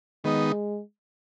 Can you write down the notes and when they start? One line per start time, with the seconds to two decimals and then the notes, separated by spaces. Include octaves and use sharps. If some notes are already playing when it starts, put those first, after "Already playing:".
0.24 D#3 G#3 B3 D#4